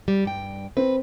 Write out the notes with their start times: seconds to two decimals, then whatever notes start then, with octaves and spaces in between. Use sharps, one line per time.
0.08 G3
0.25 G2 G5
0.77 C4 B4